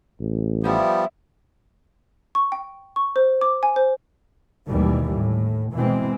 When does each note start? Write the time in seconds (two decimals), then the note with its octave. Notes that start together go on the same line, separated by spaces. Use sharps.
0.20 A1
0.64 F3 G3 B3 D#4 E4
2.35 C#6
2.52 G5
2.96 C#6
3.16 C5
3.41 D6
3.63 G#5
3.76 C5
4.66 G#1 D#2 B2 E3 G3
5.14 A2
5.74 B2 E3 G#3 C4